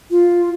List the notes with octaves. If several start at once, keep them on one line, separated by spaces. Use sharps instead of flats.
F4